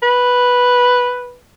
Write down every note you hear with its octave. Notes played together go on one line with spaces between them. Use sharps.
B4